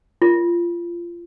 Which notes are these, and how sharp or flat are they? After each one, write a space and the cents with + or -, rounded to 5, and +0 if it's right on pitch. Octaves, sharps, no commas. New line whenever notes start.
F4 -20